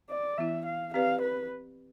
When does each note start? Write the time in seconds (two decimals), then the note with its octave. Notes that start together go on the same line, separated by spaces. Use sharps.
0.10 D5
0.38 E3 B3 E4 E5
0.65 F5
0.94 C4 G4 B4 D5 F5
1.22 B4